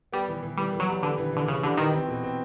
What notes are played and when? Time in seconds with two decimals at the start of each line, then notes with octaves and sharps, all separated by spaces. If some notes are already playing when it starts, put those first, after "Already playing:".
0.12 G3 B3
0.28 E3
0.43 E3
0.57 E3 G3
0.73 E3
0.80 F#3
0.88 G3
1.02 D3 B3
1.18 E3
1.33 D3 E3
1.48 C#3 E3
1.63 D3 G3
1.77 D#3 E3
1.93 C4
2.08 B2
2.23 C4